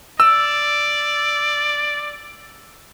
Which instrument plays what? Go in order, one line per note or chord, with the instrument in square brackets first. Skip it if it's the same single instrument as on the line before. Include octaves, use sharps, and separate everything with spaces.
[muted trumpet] D5 [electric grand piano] E6